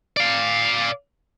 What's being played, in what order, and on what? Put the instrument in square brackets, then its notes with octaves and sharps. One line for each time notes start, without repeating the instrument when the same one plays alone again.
[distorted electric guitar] D5 F5